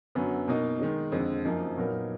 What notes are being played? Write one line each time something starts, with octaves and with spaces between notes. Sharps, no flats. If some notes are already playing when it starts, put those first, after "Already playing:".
F#2 D3 F#3 B3
B2 A#3 D#4
D#3 G#3 D#4
F2 D3 G#3
F#2 F3 A#3 D#4
A#2 F#3 B3 D#4 A#4